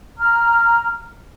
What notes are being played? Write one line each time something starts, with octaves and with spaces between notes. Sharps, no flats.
A#5 F6